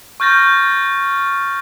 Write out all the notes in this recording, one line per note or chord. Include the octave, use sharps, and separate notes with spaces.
C#6 F6 G6 A6 A#6